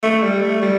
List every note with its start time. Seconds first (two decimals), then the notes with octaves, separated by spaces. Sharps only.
0.03 A3
0.22 G3
0.41 A3
0.62 G3